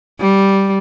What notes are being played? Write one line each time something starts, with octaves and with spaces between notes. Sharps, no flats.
G3